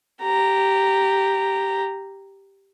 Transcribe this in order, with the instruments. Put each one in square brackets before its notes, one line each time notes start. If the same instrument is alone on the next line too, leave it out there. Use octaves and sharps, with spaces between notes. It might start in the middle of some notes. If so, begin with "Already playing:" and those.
[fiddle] G4 A#5